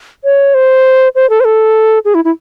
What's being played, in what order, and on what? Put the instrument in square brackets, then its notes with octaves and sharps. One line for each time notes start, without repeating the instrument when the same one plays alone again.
[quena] C#5
C5
C5
A4
C5
A4
G#4
E4
E4